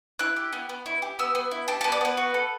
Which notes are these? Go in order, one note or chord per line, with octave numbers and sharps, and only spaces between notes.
E4 F#6
G4
B3
B3
E4
G4
B3 E6
B3
E4
G4 A5
B3 A5
D5
B3 B4
F#4
A4